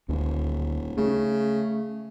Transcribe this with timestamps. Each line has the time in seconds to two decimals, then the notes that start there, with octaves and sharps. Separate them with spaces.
0.09 D#1 D2 G#3
0.97 C#3 A3